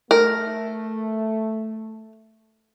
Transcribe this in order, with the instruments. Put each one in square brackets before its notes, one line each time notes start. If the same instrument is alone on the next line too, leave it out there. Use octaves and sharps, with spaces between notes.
[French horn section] A3 [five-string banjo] A#4